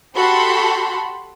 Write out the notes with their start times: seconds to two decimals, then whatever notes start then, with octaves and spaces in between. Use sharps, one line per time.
0.15 F#4 G4 A4 B5 C6